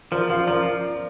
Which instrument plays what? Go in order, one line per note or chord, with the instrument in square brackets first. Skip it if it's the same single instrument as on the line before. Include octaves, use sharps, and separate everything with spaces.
[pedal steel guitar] F3 [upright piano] A#4 D5
[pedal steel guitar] F3 [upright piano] C5 F5
[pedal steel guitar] F3 [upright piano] A#4 D5